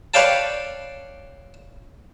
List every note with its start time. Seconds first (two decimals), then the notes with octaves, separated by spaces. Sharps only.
0.14 B4 C#5 D5 F5 G5 A5